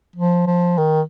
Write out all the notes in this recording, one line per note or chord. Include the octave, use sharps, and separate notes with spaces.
F3
F3
D#3